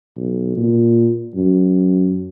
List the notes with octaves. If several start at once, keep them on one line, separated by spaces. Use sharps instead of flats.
B1
A#2
F#2